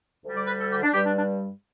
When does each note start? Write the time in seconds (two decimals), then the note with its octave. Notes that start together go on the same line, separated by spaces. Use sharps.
0.24 D2 D3 G3
0.36 D5
0.47 B4
0.59 A4
0.70 G4
0.82 D4
0.93 G2 G3 G4
1.05 D4
1.17 D4